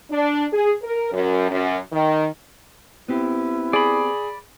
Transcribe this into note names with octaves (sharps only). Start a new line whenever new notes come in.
D4
G#4
A#4
F#2
F#2
D#3
B3 C4 E4 G4
G#4 D5 B5